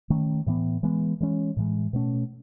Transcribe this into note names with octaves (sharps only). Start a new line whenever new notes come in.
D#3 A3 C#4
A2 E3 B3
E3 G#3 B3
E3 G#3 C#4
A2 E3 G#3
B2 A3 C#4